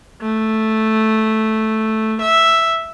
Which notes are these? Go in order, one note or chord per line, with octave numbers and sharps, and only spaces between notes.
A3
E5